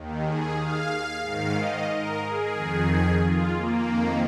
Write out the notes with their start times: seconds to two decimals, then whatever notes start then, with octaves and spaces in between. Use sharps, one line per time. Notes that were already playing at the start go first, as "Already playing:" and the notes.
Already playing: D#2 D#3
0.23 G#4
0.56 F5
1.22 G#2 D#3 F5
1.54 D#5
1.88 A#4
2.20 G#4
2.54 F2 D#3
3.19 F4
3.53 A#3
3.86 F2 D#3